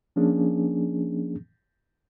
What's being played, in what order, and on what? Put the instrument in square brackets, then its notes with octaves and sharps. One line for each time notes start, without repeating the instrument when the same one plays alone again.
[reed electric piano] F3 A#3 C#4 D4 G#4